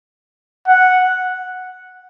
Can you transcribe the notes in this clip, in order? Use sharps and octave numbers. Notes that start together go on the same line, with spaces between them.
F#5